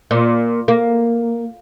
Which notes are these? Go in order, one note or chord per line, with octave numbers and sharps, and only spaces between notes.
A#2
A#3